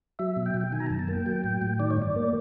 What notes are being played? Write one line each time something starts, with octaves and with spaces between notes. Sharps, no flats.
F#3 E5
B2
G5
B2
G5
D#3 G#5
A#5
A5
F#2
A5
A#3 G5
F#3
A2
A2
D#3 D5
C#5
G2 D5
A#3